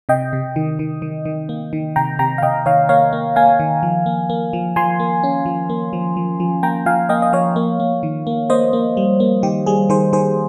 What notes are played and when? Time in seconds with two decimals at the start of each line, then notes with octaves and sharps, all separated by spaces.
0.09 C3 D#5 G5
0.33 C3
0.56 D#3
0.79 D#3
1.02 D#3
1.25 D#3
1.49 A#3
1.73 D#3
1.96 C3 G5 A#5
2.19 C3 G5 A#5
2.38 F5
2.42 C3 D#5 G5
2.66 D#3 C#5 F5
2.89 A#3 C#5 F5
3.13 A#3
3.36 A#3 F5 G#5
3.60 D#3
3.83 F3
4.06 A#3
4.30 A#3
4.53 F3
4.76 F3 G#5 C6
5.00 A#3
5.23 C#4
5.46 F3
5.70 A#3
5.93 F3
6.17 F3
6.40 F3
6.63 A#3 G5 A#5
6.86 F3 F5 G#5
7.09 A#3 D#5 G5
7.22 D#5
7.33 F3 C#5 F5
7.56 A#3
7.80 A#3
8.03 D#3
8.27 A#3
8.50 A#3 C5 D#5
8.73 A#3
8.97 G3
9.20 A#3
9.43 D#3 G4
9.66 G3 G#4
9.89 D#3 G#4 C5
10.13 D#3 G#4 C5